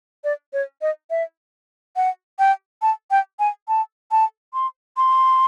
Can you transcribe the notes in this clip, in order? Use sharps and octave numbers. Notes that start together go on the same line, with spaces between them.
D5
C#5
D#5
E5
F#5
G5
A5
G5
G#5
A5
A5
C6
C6